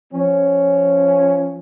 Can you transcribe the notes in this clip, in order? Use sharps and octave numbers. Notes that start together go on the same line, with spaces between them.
F3 C#4